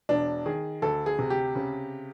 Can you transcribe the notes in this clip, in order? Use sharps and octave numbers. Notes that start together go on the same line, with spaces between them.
E1 D4
D#3 G#4
D2 A4
G#4
C3
G4
C#3